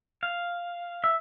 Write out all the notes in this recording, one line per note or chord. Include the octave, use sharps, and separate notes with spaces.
F5
E5